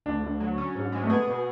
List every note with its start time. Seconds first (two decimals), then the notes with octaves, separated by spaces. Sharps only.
0.06 D2 D4
0.23 D2
0.40 F#3
0.58 C#4
0.75 G#2
0.92 G#3
1.04 A3
1.10 B3 G#4
1.27 B2